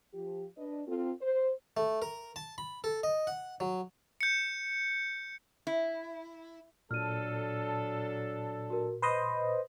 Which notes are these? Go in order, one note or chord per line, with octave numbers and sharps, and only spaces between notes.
F3 G4
D4 B4 D#5
C4 F4 A4
C5
A3
A#4
A5
B5
A4
D#5
F#5
F#3
G6 C#7
E4
A#2 F#3 D4 A4 F6 D#7
F#4 A#4
B4 C5 D#5 B5